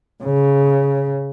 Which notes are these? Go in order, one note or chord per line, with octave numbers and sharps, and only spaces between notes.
C#3